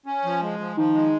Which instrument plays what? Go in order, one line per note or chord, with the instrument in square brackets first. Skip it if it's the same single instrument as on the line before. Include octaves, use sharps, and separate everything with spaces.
[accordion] C#4
F3
G#3
F3
[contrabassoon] D#3 [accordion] F3
[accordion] G#3